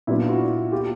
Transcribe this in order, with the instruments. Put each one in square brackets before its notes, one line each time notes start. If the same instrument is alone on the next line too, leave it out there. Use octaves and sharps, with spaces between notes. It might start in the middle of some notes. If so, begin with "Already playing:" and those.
[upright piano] A#2 F#3 B3 D4 [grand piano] E4
[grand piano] F4
E4 F#4
F4 G4